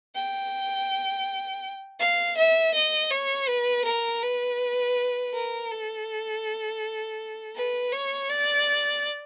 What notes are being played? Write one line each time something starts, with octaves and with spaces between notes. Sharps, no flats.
G5
F5
E5
D#5
C#5
B4
A#4
B4
A#4
A4
B4
C#5
D5